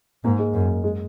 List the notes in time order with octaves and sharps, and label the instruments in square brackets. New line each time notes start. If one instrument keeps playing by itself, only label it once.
[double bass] G#2 [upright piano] A#3
[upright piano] G#3
[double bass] F#2
[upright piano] G#3